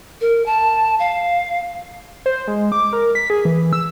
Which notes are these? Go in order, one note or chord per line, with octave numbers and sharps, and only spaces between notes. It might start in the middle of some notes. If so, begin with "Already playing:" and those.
A#4
A5
F5
C5
G#3
D6
A#4
B6
G#4
E3
E6